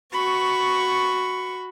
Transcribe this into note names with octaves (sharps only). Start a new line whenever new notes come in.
F#4 B5 C#6